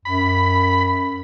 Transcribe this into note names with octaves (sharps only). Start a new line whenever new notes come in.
F#2 B5